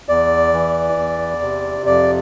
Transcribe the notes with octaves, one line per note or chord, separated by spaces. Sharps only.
E2 D5
E3
E2
C3
F2 D5